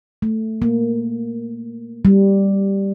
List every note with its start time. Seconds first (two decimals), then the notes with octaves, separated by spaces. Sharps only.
0.22 A3
0.62 A#3
2.05 G3